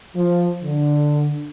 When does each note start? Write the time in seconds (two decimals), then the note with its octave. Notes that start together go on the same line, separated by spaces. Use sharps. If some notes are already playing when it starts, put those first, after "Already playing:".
0.16 F3
0.63 D3